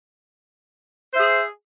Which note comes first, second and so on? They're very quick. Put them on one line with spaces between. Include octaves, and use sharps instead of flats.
C5 E5 G#4